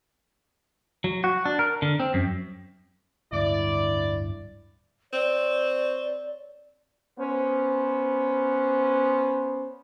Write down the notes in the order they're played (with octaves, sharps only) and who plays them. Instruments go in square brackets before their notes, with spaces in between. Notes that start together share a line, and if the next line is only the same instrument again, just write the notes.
[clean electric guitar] F#3
F#4
D4
A#4
D3
C4
F#2
[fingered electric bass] D1 G2 D3 [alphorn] E4 [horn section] D5
[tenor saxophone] C4 [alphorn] C#5 [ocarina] D5
[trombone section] B3 C#4 C5